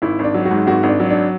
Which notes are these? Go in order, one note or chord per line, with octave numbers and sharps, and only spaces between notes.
G#1 E4
G#1 D4
F#3
F#4
G#2
G#1 F#4
G#1
D4
F#3
D4